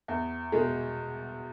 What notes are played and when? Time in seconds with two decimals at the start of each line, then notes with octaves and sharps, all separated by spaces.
0.08 E2
0.52 B2 G#3